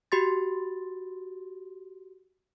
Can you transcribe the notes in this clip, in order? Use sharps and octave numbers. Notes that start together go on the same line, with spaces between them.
F#4 G4 C6 A6